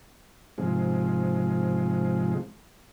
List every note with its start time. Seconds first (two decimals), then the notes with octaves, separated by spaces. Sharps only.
0.58 G#2 C3 F3 G#3